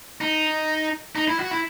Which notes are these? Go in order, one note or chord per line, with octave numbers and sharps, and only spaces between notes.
D#4
D#4
E4
F#4
E4